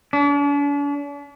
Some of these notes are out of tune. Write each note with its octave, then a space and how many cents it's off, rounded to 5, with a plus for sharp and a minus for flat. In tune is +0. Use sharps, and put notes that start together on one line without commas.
D4 -45